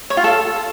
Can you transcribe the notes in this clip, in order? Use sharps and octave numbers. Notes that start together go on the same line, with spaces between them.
C#5
F4
A4